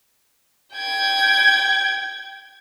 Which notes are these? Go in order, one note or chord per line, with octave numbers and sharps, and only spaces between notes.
G5 G#6